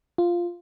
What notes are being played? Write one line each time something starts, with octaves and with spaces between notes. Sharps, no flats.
F4